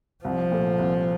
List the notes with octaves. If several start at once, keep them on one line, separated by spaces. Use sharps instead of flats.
C2 F3
A#2 A3
C2